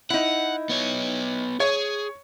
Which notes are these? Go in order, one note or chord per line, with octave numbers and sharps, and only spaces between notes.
D#4 E4 F#5
B3 C#5
G#4 C#5